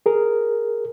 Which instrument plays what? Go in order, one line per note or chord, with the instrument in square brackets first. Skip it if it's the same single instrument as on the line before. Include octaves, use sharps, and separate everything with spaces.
[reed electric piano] G#4 A#4